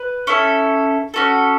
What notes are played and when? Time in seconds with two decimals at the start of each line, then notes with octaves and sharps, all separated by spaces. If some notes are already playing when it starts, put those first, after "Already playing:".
Already playing: B4
0.27 C#4 E4 A4
1.14 C#4 F#4 A4